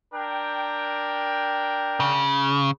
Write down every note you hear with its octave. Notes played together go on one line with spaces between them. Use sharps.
D4 A#4 G5
C#3